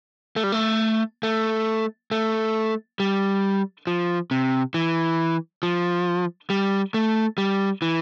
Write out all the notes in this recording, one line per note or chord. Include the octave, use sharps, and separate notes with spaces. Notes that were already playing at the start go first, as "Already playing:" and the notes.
A3
G3
A3
A3
A3
G3
F3
C3
E3
F3
G3
A3
G3
E3